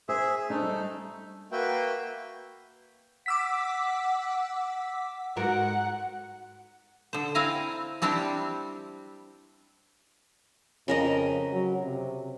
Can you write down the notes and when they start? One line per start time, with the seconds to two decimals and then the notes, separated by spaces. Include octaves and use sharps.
0.09 G#4 C5 E5
0.50 A3 D4 D#4
0.62 G3
1.52 A#3 F#4 B4 E5 G5
3.26 F#5 D6 E6 B6
5.37 G#2 F#4 A#4 F#5
7.13 D3 C5
7.35 C4 E4 F5 G#5 A#5
8.02 G3 C4 D4 E4 G4
10.88 F2 C#3 A#4 D#5
11.52 F#3
11.83 C3